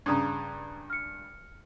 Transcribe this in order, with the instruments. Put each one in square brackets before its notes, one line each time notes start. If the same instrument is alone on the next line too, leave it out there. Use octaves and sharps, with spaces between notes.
[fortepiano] G2 C#3 [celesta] A#5 D#6 G#6
[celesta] F6 C#7